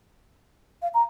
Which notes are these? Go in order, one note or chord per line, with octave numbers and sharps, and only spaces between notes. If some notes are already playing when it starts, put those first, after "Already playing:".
F5
A#5